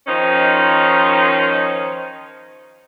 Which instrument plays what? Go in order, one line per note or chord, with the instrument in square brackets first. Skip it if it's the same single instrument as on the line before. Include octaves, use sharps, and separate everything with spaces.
[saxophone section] D#3 F3 C#4 D#4